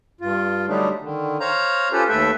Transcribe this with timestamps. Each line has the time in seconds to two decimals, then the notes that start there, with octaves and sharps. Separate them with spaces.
0.21 G2 F4
0.68 D3 F#3 G3 A3 D4 D#4
1.02 D3 D#3
1.40 C5 C#5 F5 A#5
1.92 C#4 F4 G4 A4 B4 C5
2.09 D#2 A3 A4 B4 E5 G5